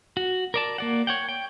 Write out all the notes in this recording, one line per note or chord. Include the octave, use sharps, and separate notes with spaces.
F#4
A#4 D5 A5
A#3 D5 F#5
C#5 F#5 G5
G5